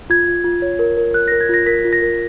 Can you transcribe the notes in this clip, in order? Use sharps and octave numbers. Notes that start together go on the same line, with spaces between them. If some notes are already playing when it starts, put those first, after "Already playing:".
F4 G#6
F4
F4
C#5
A#4
A#4
A#4 F#6
A#6
A#4
G#6
F4 A#6
A#4 B6
F4
A#6
A#4